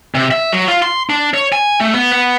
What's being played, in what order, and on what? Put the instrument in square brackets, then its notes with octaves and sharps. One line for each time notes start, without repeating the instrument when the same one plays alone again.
[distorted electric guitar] C3
E5
F#3
F4
C6
D4
C#5
G#5
A3
B3
B3